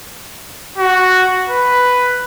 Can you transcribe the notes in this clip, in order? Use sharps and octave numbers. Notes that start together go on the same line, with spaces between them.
F#4
B4